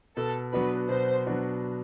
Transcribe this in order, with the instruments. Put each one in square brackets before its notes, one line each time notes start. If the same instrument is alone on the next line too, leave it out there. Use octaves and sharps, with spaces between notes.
[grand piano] B2 [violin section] A4
[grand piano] F#3 B3 D4 F#4 [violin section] B4
[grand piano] B2 [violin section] C5
[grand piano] F#3 B3 D4 F#4